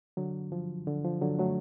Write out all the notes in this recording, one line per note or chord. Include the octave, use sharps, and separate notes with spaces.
D3 F#3
F3
D3
F3
D3 F#3
F#3 A3